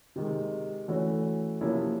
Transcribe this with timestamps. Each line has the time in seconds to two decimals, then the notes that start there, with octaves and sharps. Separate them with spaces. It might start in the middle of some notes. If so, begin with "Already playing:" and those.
0.16 C3 D#3 G#3
0.88 E3 A3 C#4 F#4
1.61 C3 F3 A#3 C#4 E4